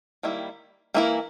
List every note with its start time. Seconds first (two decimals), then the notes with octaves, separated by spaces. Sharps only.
0.23 D#3 G3 A#3 E4
0.94 E3 A#3 E4 A#4